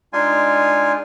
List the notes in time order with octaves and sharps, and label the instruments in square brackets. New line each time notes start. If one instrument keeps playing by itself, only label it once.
[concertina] G#3 D4 D#4 F4 G#5 C6